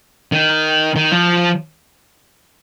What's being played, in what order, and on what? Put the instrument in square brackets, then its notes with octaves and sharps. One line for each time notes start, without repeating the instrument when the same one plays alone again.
[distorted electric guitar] D#3
D#3
F3